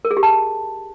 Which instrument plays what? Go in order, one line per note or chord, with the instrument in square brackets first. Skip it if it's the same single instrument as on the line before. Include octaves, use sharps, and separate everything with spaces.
[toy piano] A#4
G#4
G4
A5